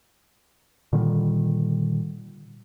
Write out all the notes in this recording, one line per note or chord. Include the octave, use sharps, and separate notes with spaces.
A#2 D3 D#3 G3